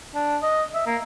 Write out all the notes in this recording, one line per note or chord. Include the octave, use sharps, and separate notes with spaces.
D4
D#5
E5
A#3